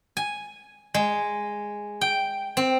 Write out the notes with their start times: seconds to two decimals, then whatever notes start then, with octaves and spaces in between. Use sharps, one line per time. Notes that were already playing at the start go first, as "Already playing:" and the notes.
0.17 G#5
0.94 G#3
2.01 G5
2.57 C4